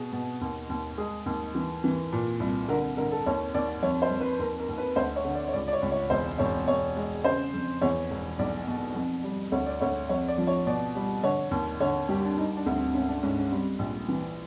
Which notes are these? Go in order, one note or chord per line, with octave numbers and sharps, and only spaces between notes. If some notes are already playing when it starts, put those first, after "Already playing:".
Already playing: B2 G#4
B2
D#2
D#2
G#3 G#4
D#2
E3
E3
A#2
C2
D3 A#4
D3 A#4
A4
D#2 C#5
D#2 D5
F2 C#5
C5
F2
B4
D#2 A#4
A#4
D#2
B4
D2 C5
C#5
D3
D5
C#5
C#2 D5
D5
C#5
C#2
C#5
E1 C5
E1 C#5
E1 C#5
G#3
C#3 C5
F2
E2 C#5
E1
B1 D5
B2
F2
G3
D2 C#5
D5
D2 C#5
F2 C#5
D5
F3
C#5
B2 D5
G3
D3 C#5
D#2
D3 C#5
G2 G4
D4
G3 D#4
D4
D2
C4
G#1 C#4
D4
G#2 C#4
C#4
G3 C4
A#1
E3